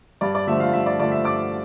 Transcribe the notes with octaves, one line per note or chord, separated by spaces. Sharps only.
G2 D5
D5
D3 F3 A3 E5
F4 F5
G2 E5
D5
D3 F3 A3 D5
E5
G2 D5 D6